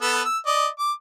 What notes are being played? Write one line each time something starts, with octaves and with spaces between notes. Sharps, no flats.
B3 A4 B4
E6
D5 D#5
D6